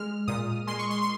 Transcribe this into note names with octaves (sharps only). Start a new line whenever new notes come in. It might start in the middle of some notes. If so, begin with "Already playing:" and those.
Already playing: G#3 F6
A#2 D#6
G#3 C6
C#6
C6
C6